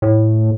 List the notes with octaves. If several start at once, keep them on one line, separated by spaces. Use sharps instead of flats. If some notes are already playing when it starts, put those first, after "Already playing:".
A2